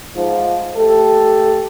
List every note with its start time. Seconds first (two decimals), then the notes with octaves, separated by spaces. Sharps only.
0.15 G#2 F3
0.76 A3 G4 A4